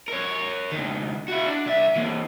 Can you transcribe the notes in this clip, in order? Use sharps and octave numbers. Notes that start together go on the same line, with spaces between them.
A#4 C#5
C#2 D#3
E4 F#4
D4
C2 E5
E3 A#3